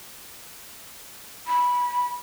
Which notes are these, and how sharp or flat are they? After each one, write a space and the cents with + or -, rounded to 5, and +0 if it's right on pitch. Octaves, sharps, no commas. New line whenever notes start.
B5 -15